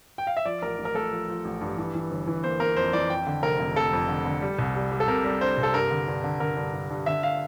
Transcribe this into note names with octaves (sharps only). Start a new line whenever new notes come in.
G5
F5
E5
F3 D5
A1 A#4
A1
A#4
A3 A4
F3
F3
A1
G2
E3
E3
G1
E3
A#3 C5
A#3 A#4
F2 C5
E3 D5
F2 G5
D3
F1 A#4
F1
F1 A4
F2
D3
D3
G3
C2
G3
G3
A4
C3 A#4
G3
D4 C5
C2
A4
G2 A#4
D3
G2
D3
D3 A#4
G2
G2
G2
D3 E5
F5